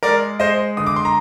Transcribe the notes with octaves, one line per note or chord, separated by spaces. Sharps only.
G#3 A#4 D5
G#3 C5 D#5
G1 D#6
D6
C6
A#5